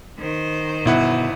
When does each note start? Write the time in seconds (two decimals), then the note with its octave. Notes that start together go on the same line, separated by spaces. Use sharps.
0.19 D#3 C5
0.86 G1 B2 E4 F#5